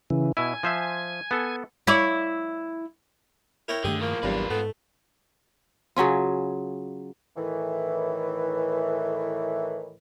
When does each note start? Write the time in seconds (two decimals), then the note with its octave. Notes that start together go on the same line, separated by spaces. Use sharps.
0.10 C#3 E3
0.37 B2 E4 G#5
0.63 F3 C5 E5
1.31 B3 A4
1.87 E4 C#5 D5
3.68 E4 A#4 C#5 G5
3.84 G2 D3 D#3 A3 G4 G#4
4.01 A2 F3 A#3
4.23 G#1 E2 G2 F#3 G3 F4 B4
4.50 G#2 A3 B3
5.96 C#3 F#3 C#4 F4
7.37 A2 D#3 E3